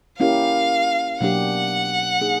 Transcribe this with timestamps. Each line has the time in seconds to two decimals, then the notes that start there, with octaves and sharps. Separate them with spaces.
0.20 A#3 C#4 E4 G4 A#4 F5
1.20 B2 F#3 A#3 D4 G4 F#5
2.21 A#3 D#4 G#4